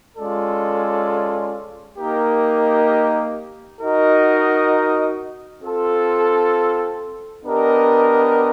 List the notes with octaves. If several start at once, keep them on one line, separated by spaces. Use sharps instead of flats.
G#3 C#4 F4 A4 D5
A#3 D#4 G4 A#4 D#5
D#4 F#4 A#4 D#5
C4 F4 A4
B3 D4 G4 A#4 D#5